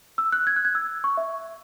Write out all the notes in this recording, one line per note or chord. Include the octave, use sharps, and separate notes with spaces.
E6
F#6
G#6
F#6
G#6
E6
C#6
E5